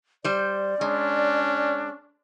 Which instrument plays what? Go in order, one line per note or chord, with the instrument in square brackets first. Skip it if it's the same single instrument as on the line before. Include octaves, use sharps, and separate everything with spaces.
[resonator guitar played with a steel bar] G3 C5 [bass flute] D5
[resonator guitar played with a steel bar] G#3 [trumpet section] C#4 D4